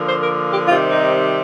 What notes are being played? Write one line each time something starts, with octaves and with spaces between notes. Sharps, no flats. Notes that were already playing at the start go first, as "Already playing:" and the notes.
Already playing: D3 F3 A#3
C5
A#4
G4
C3 D#3 G3 C4 F4
D#4